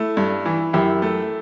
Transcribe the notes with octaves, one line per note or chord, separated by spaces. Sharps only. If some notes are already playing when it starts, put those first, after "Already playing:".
Already playing: A3 E4
G2
E3
F#2 E4 G4
A3